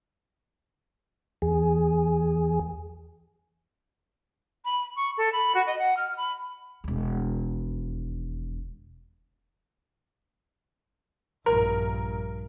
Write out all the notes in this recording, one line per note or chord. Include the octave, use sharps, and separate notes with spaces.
E2 G#4
B5
C#6
A4
B5
F#4
D#5
F#5
F6
B5
E1 D#2
A#1 G2 A#4